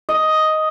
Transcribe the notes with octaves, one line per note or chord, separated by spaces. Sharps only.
D#5